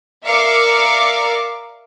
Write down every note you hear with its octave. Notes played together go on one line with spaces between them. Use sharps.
A#4 D5 E5 F5 D6 C#7